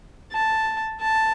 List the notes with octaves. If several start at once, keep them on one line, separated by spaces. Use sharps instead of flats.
A5
A5